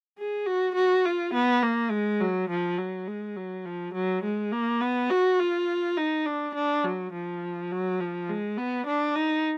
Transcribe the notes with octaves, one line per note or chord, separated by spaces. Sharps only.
G#4
F#4
F#4
F4
B3
A#3
G#3
F#3
F3
F#3
G#3
F#3
F3
F#3
G#3
A#3
B3
F#4
F4
D#4
D4
D4
F#3
F3
F#3
F3
G#3
B3
D4
D#4